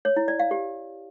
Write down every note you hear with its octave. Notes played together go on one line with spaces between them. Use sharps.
C#5
E4
D5
F5
G4